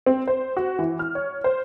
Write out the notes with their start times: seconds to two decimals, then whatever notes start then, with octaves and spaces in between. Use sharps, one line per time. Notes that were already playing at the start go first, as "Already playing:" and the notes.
0.06 C4
0.28 C5
0.57 F#4
0.79 E3
0.99 F6
1.15 C#5
1.44 C5